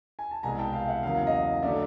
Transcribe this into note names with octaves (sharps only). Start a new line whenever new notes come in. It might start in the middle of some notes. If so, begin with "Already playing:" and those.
G#5
A5
C2 B2 G#3 G#5 A#5
G5 A5
F5 G5
E5 F#5
E2 C#3 F#3 A#3 F5
F#5
D#5 F5
D3 F#3 A3 D5 E5